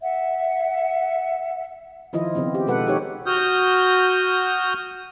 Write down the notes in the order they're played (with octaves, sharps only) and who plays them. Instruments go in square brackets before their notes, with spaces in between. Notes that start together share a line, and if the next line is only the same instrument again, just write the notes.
[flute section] E5 F#5
[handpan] D#3 F3 E4 F4 D#5
C#3 F3 B3 C4
G4
B2 G#3 A4 B4 F#5
D#4 G4 C#5
[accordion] F#4 D#6 F6 G6